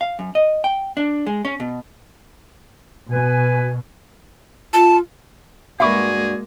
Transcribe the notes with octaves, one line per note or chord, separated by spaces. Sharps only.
F5
F#2
D#5
G5
D4
G#3
C#4
B2
B2 B4 G#5
F4 A5
G2 G#3 A#3 F#4 G#4 E5 B5 C#6